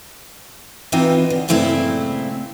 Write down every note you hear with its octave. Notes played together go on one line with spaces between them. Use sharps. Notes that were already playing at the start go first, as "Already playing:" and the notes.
E3 B3 C4 D#4 F4
D3
G2 A#2 C#3 A3 C4 E4